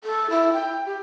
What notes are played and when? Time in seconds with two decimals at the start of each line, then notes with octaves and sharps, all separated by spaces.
0.04 A4
0.30 E4
0.53 G5
0.86 G4